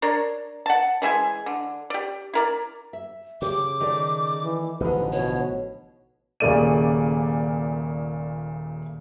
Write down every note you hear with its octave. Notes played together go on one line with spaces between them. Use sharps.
D4 A#4 C#5
F#5 A5
E3 G#3 E5 G#5
D3
G4 D5
E4 A#4 D5
E5
C#3 G4 D6
D#3 A3 D5
E3
A1 D3 F3 D#4 B4
B2 C#5
D#1 A#2 C#3 A3 D5 D#7